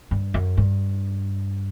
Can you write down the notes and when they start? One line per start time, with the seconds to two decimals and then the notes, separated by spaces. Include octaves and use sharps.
0.11 G2
0.34 F#2
0.57 G2